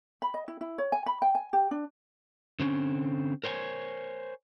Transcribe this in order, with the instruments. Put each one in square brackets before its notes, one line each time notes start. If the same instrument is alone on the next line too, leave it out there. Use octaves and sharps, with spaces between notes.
[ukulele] B5
D#5
E4
E4
C#5
G#5
B5
G5
G#5
G4
D4
[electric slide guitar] D3 C4 C#4
A#4 C5 C#5 G5 G#5